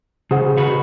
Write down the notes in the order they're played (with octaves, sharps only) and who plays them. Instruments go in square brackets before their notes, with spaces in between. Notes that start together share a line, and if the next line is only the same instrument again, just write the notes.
[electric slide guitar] C#3 [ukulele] G#4 C5 F#5
[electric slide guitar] C#3 F#4 B4